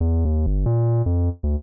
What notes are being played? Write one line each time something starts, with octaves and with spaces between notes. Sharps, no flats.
E2
D#2
G1
A#2
F2
D2